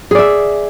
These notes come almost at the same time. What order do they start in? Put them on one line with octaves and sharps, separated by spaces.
G#4 D5 E5